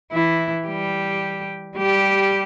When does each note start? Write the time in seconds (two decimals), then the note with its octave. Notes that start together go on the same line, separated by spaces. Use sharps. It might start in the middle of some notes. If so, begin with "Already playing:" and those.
0.12 E3 E4
0.67 G3 G4
1.78 G3 G4